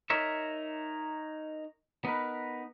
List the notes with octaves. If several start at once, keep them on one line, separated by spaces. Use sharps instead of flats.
D#4 A#4 C#5 E5
B3 D#4 A#4 B4